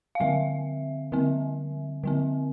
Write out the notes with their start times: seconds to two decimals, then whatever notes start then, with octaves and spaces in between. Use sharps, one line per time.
0.15 F5
0.20 D3 G3 C4 E5
1.12 D3 G3 C4
2.04 D3 G3 C4